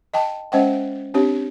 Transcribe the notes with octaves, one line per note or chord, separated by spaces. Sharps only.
D#5 G5 A5
G#3 C#4 C5 D#5 F#5 G5
C4 D4 G4 C#5